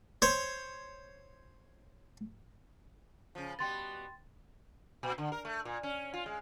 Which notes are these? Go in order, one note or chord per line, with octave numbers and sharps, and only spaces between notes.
C5 C#5
C#3 F3
B2 G3 B3 G5 C6 A6
A#2
D3
A#4
A3
A#2
C#4
F4
G#3